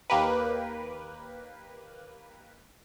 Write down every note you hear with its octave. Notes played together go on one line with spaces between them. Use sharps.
D#2 A#3 G4 A#4 B4